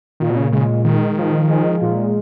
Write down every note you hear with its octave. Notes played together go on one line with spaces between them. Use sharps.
A#2 D#3
B2
C#3
C#3 G#3
D#3 G#3
F3
G#3
A#2